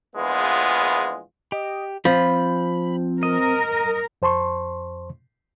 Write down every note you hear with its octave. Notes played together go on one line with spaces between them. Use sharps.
A#1 E2 G#3 B3 F4
G4 D#5
F3 C4 B5
A#4 D#5
F2 C5 A5 C6 C#6